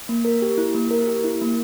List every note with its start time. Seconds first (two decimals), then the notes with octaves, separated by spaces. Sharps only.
0.09 A#3
0.25 A#4
0.42 G4
0.58 E4
0.75 A#3
0.91 A#4
1.07 G4
1.24 E4
1.41 A#3